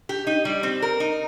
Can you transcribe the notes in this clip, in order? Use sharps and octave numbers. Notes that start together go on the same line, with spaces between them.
G4
D#4
G3
C4
A#4
D#4